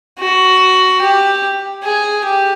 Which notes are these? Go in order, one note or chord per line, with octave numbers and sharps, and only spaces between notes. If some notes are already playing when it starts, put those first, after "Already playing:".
F#4
G4
G#4
G4